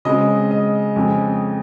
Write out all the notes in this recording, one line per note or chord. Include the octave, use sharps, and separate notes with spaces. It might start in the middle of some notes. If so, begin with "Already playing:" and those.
C#3 G#3 C4 D#5
D#5
F2 C#3 G#3 C4